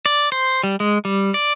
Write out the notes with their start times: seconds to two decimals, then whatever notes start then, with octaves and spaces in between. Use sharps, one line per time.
0.06 D5
0.32 C5
0.64 G3
0.80 G#3
1.05 G3
1.34 D5